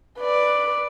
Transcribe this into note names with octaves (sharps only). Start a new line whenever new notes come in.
B4 D5